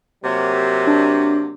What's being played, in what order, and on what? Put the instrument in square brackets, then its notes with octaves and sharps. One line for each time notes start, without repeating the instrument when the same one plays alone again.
[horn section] C3 F#3 A#3
[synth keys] D4